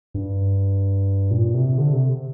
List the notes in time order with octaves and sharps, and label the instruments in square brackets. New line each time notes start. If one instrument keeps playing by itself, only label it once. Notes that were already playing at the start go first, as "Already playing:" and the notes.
[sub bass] G2
A#2
C3
D3
C3